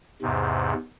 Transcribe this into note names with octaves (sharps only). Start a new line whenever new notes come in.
E2 G#2 C3